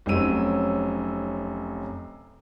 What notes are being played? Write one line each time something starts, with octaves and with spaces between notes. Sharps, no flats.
F1 F#3 C4 C#4 E6 D#7